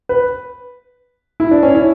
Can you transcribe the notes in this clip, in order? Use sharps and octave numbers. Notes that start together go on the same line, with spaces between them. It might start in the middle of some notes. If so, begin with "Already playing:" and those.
B4
E4
D4
C#4
E4